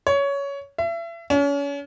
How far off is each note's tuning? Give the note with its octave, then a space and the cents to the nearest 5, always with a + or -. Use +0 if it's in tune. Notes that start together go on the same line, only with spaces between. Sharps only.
C#5 +15
E5 +35
C#4 +35